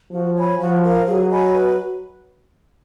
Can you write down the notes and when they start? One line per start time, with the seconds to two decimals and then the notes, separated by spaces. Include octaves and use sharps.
0.11 F3 F#4
0.35 C#5 G#5 B5
0.59 F3 F#4
0.83 A#4 F5
1.07 F#3 G#4
1.30 D#5 G#5 B5
1.54 B4